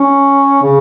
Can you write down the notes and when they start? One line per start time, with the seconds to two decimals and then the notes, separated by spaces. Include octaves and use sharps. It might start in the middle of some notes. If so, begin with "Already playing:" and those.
Already playing: C#4
0.63 C#3